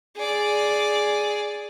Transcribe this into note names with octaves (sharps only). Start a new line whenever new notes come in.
G#4 D5